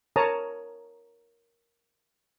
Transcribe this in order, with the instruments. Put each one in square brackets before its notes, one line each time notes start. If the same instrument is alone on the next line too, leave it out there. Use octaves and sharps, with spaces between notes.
[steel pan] A#4 C#5 A5 A#5 D#6